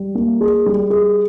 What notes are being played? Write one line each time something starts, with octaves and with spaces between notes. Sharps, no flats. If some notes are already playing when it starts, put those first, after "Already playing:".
Already playing: G3
A#3
G#4
G3
G#4